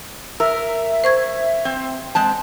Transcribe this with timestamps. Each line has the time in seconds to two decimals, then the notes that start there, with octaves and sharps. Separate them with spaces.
0.40 A#4 E5 E6
1.04 C5 C#6 G#6
1.65 C4
2.15 G#3 C4 A5